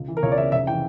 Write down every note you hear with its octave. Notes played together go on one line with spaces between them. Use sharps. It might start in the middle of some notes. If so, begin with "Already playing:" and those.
Already playing: C#2
E3
A#4
C#2 C#5
D5
C#3 E5
F1 E5
E3 G5